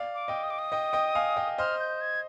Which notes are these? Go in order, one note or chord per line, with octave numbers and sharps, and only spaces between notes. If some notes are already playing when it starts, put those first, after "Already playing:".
Already playing: D5 F5
D6
D#5 G5
D#6
D6
D#6
D#5 G5
D#5 G5
F5 G#5
D#5 G5
C5 D#5 F6
G6
G#6